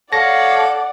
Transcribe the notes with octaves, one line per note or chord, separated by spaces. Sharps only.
A4 C#5 D5 F5 F#5 A#6